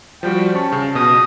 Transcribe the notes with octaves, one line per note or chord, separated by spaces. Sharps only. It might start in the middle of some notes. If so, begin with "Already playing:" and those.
F3 G3 F#4 G5
C#4 A5 C#6
C#3
B2 D#6